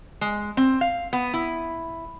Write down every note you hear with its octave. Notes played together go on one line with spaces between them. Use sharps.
G#3
C4
F5
B3
E4